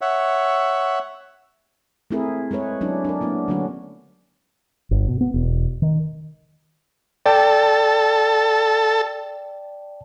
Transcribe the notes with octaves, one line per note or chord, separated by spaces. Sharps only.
C#5 E5 F#5
A3 C4 E4 G#4 A#4
G#3 G#4 B4 C#5
F#3 C#4 D4 E4
D4 A#4
A#3 B3 E4
D3 F#3 A3 C#4 D4 F#4
G1
B2
B3
E1
D#3
A4 D5 G5 A5